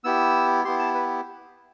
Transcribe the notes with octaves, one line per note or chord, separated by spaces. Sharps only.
B3 E4 G4 E6
B3 E4 G4 C6
A5
B4